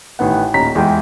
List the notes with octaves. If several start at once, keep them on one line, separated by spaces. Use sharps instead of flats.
A1 D#3 B3 F#5
D#1 C#4 D#4 A#5 B6
E2 G#3 G5